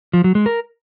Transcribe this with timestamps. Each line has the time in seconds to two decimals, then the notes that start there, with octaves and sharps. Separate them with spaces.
0.13 F3
0.24 F#3
0.35 G#3
0.46 A#4